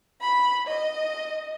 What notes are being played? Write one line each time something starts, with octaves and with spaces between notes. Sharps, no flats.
B5
D#5